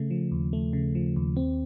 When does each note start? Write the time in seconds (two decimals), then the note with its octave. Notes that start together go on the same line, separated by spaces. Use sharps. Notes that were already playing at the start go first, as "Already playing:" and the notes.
Already playing: C#3 A3
0.11 F3
0.32 D#2
0.53 A3
0.73 C#3
0.95 F3
1.16 D#2
1.37 C4